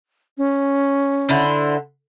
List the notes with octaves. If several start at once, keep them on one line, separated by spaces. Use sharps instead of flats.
C#4
D3 E4 C5